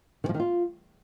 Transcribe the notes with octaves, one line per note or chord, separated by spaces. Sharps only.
D#3
F3
D#3
F4